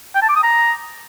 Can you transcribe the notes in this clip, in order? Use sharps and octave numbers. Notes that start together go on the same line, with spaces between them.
G5
A5
D6
D#6
A#5